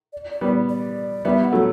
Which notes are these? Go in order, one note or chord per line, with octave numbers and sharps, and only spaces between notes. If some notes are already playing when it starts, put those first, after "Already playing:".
D5
D5
G3 B3
D5
G3 B3 E5
F#5
F#3 A3